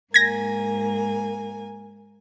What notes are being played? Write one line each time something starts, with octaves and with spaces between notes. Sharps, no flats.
G#2 A#3 G#5 G#6 A#6